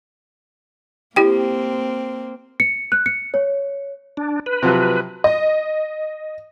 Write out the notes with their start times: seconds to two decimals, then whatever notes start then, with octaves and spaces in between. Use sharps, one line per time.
1.16 A#3 C4 E4 G4 G5
2.60 C#7
2.92 F#6
3.06 C#7
3.34 C#5
4.17 D4
4.46 B4
4.63 C3 F3 F#3
5.24 D#5